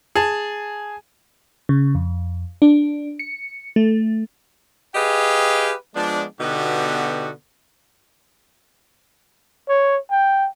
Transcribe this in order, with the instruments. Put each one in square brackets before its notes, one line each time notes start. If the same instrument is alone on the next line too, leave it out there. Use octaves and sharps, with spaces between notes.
[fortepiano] G#4 A5
[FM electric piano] C#3
F2
D4
C#7
A3
[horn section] G4 G#4 B4 D#5 F5 G5
F3 G#3 B3 D4
B2 D3 B3 D#4 F#4 G4
[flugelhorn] C#5
G5